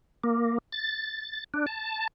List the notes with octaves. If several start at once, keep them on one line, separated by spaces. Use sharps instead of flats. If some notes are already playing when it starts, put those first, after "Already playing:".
A#3
A6
D4
A5